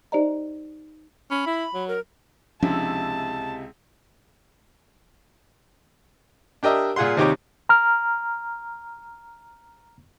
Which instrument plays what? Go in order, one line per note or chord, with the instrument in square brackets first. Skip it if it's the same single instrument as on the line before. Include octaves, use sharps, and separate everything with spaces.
[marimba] D#4 G4 C5 D5 D#5 A#5
[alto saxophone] C#4 [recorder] B5
[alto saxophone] E4
F#3
[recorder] A#4
[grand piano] C#2 C3 E4 [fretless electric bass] F3 C#4 D4 [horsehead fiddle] A5
[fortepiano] D4 G4 A#4 D#5 E5
A#2 F4 G#4 F#5 C6
D#2 C3 D#4 G4 C#5 D6
[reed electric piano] A#5 F6